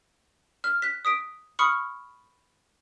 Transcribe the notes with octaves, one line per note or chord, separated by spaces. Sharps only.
F6
F#6 B6
D#6 B6 D7
B5 C#6 D#6 F6 C#7